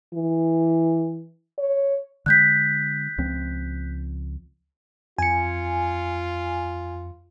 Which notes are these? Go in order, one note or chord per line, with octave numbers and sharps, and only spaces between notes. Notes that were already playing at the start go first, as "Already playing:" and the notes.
E3
C#5
D3 G#3 F#6 G6 B6
C#2 F3 C4
F2 F4 G#5 C#7